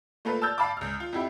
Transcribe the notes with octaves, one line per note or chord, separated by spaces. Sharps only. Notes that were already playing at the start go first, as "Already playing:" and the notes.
A3 A#3 F4 A4 B4
A5 E6 F6 G6 A6
F5 A5 B5 D6
C#2 F6
F4
F2 E4 G4